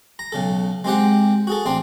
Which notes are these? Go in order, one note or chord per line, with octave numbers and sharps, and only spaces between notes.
A#5
B1 C#3 A4
G#3 C4 G4 F#5
F#4 G#4 A4
A1 C4 D4 C6